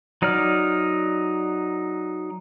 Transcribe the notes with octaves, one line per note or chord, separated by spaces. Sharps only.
F#3 D#4 C#5 D5 F6